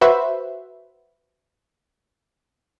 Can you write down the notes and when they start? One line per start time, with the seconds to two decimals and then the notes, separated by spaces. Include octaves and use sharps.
0.01 F#4 B4 C5 E5